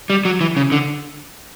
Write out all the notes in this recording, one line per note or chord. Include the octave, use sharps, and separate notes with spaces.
G3
F#3
E3
C#3
D3